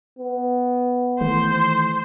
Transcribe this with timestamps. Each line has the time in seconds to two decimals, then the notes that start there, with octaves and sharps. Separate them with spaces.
0.19 B3
1.21 D#3 E3 A3 C5